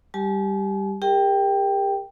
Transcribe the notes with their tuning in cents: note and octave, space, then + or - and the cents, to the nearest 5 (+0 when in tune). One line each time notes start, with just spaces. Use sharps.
G3 +5 G4 +0 G#5 +45
G4 +40 A#4 +0 G5 +0